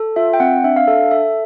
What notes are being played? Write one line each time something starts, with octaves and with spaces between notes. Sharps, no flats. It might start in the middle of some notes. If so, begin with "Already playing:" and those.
Already playing: A4
F4 E5
G5
C4 F#5
D4 E5
F5
A4 E5
A4 E5